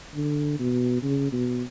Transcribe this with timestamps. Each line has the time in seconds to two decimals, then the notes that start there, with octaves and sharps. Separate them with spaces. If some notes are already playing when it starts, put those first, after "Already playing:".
0.15 D3
0.59 B2
1.03 C#3
1.32 B2